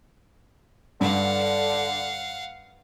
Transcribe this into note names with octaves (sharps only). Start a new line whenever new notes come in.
G2 D3 F5 F#5